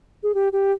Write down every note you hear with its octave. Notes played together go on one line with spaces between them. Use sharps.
G#4
G4
G4